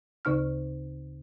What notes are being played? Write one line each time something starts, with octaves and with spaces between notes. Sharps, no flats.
D2 C#3 D#4 F6